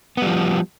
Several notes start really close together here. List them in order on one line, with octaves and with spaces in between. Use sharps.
B3 G3 F3